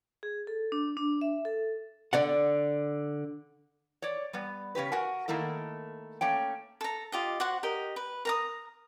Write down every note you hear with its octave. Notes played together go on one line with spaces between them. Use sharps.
G#4
A4
D4
D4
E5
A4
D3 D5 F#5
C#5 D5
G3 B3
C#3 C#4 G4 B4
F#4 A#4 F#5 G#5
D#3 A3 A#3 E4 A#4
A3 A#3 C#4 G5
A4 A#5
F4 G4 D#5
F#4 C5 F#5
G4 A#4 D#5
B4
A#4 A#5 D#6